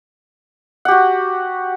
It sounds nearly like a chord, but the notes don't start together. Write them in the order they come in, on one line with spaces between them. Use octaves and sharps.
F#5 G4 F#4